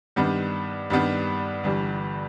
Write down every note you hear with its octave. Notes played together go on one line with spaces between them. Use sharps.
G2 D#3 G3 B3 D4
G2 D#3 G3 B3 D4
G1 G2 E3 G3